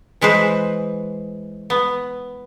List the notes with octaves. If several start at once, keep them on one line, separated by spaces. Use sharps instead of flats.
E3 G#3 B4 C5
B3